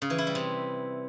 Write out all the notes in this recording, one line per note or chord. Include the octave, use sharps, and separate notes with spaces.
C#3
E3
E4
G3
C3